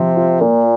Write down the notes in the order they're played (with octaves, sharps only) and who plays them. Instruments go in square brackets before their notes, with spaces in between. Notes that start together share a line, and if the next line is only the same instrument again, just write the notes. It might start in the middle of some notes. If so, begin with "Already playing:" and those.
Already playing: [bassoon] C3 [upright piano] F3
[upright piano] F4
[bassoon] A#2 [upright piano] A#3